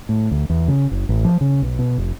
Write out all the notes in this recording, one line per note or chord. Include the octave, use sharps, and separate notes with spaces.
A2
D2
E2
C#3
F#1
A1
F3
C#3
B1
B2
F1